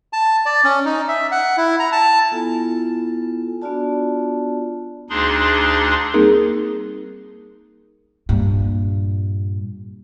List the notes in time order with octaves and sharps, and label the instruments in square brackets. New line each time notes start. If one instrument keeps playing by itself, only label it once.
[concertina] A5
D5
C#4
D#4
E5
F#5
E4
A#5
A5
[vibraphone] B3 E4 F4 A4 G#5
B3 D4 F4 F#4 D5 A5
[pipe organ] D2 D4 D#4 G#4 C6
[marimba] G3 A#3 C4 D#4 G#4 A#4
[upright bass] G2 A#2